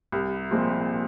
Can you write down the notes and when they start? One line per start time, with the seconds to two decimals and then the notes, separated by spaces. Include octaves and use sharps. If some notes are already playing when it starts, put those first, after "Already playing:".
0.12 C2
0.51 A#2 F3 G#3 C4